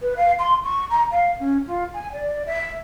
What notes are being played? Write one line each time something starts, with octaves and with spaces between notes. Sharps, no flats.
B4
F5
C6
C#6
A#5
F5
C#4
F4
G#5
D5
E5